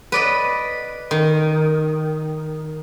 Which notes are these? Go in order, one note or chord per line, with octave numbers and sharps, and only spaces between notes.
B4 D5 D#5
D#3